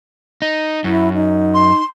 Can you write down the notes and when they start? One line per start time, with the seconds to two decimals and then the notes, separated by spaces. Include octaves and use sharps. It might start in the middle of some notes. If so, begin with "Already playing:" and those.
0.42 D#4
0.84 F#2 E4
1.14 D#4
1.54 C6